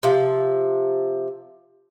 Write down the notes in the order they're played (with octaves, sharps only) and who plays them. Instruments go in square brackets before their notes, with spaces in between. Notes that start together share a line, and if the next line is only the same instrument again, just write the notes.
[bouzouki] C3 F3